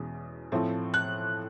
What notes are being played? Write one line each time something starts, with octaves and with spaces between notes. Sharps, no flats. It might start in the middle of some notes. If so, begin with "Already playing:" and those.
Already playing: E2 B2 G#3 C#4
A2 F3 A3 C4
F#6